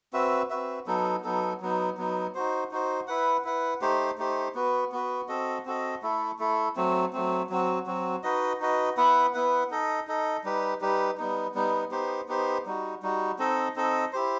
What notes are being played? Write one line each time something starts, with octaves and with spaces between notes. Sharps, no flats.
C4 F#4 B4 E5
C4 F#4 B4 E5
F#3 B3 D#4 A4
F#3 B3 D#4 A4
F#3 B3 D#4
F#3 B3 D#4
D#4 F#4 C5
D#4 F#4 C5
E4 B4 F#5
E4 B4 F#5
A3 D#4 G4 C5
A3 D#4 G4 C5
B3 F#4 B4
B3 F#4 B4
C4 F#4 A4 D#5
C4 F#4 A4 D#5
A3 E4 A4
A3 E4 A4
F#3 A3 C4
F#3 A3 C4
F#3 C4 F#4
F#3 C4 F#4
D#4 F#4 B4 D#5
D#4 F#4 B4 D#5
B3 E4 B4 F#5
B3 E4 B4 F#5
D#4 A4 D#5
D#4 A4 D#5
G3 D#4 G4 B4
G3 D#4 G4 B4
G3 B3 D#4
G3 B3 D#4
B3 D#4 G4 C5
B3 D#4 G4 C5
G3 D#4 F#4
G3 D#4 F#4
C4 D#4 A4 D#5
C4 D#4 A4 D#5
E4 G4 C5